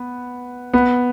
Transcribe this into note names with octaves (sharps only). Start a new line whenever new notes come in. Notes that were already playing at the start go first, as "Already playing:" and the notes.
Already playing: B3
B3